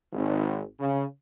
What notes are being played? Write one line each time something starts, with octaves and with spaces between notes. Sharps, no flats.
G#1
C#3